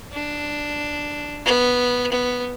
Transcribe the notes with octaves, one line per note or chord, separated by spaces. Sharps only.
D4
B3
B3